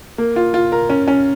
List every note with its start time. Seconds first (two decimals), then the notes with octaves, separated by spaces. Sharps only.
0.18 A#3
0.36 F4
0.54 F4
0.72 A#4
0.90 C#4
1.08 C#4